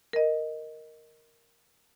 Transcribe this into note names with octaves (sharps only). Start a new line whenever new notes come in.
A#4 D#5